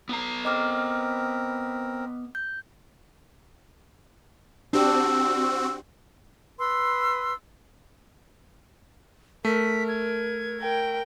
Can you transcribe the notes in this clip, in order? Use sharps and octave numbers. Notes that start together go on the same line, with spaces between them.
B3 A#5
C4 A#4 D#5 D6 F6
G6
C4 D4 F#4 G4 E6
B4 C6 E6
A3 A#4 B6
G#6
A#4 G5